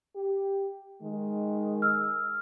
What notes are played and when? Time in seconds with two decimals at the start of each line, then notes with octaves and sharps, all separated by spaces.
0.16 G4
1.03 D#3 G#3
1.82 E6 F6